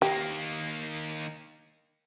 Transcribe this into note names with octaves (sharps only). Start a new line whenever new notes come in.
D#3 A#3 G4